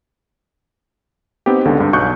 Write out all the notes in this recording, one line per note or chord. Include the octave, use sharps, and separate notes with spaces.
B3 C4 D#4 G4
C#2 D3 G#3
G2
B1 B2 C#6 F#6 G6